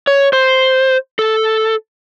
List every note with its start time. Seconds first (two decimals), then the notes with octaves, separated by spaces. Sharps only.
0.07 C#5
0.33 C5
1.19 A4